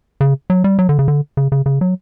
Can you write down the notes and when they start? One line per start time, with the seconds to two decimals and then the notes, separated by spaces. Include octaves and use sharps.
0.21 C#3
0.50 F#3
0.64 G3
0.79 F#3
0.89 D3
0.99 C#3
1.08 D3
1.37 C#3
1.52 C#3
1.66 C#3
1.81 F#3